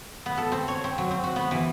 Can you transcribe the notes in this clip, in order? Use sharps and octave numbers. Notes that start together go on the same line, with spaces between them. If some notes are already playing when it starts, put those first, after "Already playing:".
B3
A4
C4
C#5
C4
F#3
C4
F#4
B3
E3